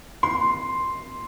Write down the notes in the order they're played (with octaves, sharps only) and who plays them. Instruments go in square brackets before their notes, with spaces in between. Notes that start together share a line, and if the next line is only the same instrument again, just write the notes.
[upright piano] C6